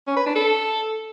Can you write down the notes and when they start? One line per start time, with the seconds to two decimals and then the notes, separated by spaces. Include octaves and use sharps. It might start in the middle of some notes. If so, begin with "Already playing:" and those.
0.07 C#4
0.17 B4
0.26 D4
0.35 A4